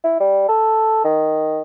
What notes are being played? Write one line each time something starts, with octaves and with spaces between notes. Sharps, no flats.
E4
G3
A4
D#3